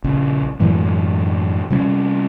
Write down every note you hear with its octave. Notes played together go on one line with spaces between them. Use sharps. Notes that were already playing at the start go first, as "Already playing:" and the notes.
A#1 C#3
F#2 A2 E3 G#3
C3 G3 B3 C#4